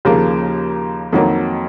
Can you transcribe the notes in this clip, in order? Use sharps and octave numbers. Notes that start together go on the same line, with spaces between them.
D#2 C#3 F3 A#3
F2 D#3 F#3 A#3